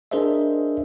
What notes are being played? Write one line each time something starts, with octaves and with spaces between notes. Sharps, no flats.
D4 G#4 A#4 C5 D#5 E5